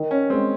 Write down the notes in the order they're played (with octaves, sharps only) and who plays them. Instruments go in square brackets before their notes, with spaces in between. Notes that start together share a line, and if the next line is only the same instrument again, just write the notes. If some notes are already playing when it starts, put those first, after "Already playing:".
Already playing: [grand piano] D#3
[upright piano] C#4
[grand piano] G#3 [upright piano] C4